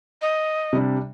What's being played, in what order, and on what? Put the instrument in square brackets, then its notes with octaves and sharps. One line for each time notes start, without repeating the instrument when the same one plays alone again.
[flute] D#5
[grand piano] C3 G3 D4